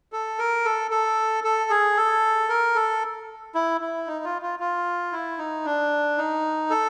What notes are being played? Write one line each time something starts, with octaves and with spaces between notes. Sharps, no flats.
A4
A#4
A4
A4
A4
G#4
A4
A#4
A4
E4
E4
D#4
F4
F4
F4
E4
D#4
D4
D#4
A4